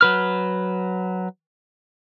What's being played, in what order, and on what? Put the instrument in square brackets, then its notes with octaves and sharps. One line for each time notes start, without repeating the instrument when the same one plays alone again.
[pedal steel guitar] F#3 B4 F6